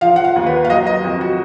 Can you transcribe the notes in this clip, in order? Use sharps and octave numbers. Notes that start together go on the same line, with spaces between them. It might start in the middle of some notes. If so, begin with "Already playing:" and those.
F3 F5
F#5
F5
D#2
B4
F5
F#3 D#5
D#5
F2
F#4